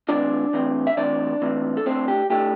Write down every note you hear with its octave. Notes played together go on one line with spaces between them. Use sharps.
A2 E3 C4 D4 D5
A2 E3 C4
E5
A2 E3 C4 D4 D5
A2 E3 C4
A4
A2 A3 C4 D4 C5
G4
A2 A3 D4 G4